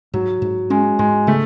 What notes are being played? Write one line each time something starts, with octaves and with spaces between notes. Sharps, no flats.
G#2 F#3
G#2
G#3 C#4
G#2 G#3
C#3 A3